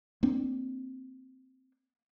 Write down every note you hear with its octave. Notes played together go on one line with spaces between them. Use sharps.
A#3 C4 D4